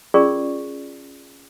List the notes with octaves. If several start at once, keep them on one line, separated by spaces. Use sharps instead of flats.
C#4 F4 G#4 A#4 D5 C#6